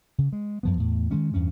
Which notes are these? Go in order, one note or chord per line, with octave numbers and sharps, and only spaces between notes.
C#3
G#3
F#2 F3 B3
E2 A2
D#3 G#3 C#4
E2 G2 C#4